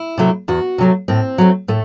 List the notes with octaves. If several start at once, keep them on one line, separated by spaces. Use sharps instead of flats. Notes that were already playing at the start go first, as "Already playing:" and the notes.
Already playing: E4
C3 F#3 A3
E2 F#4
C3 F#3 A3
A2 C4
F#3 A3
A2 A3